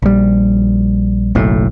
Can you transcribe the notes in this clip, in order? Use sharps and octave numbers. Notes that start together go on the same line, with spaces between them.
A#1 G3
F#1 B1 A2